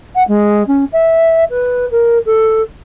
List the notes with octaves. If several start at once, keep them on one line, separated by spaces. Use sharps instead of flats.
F#5
G#3
C#4
E5
B4
A#4
A4